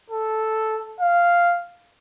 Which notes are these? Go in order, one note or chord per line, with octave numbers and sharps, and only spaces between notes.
A4
F5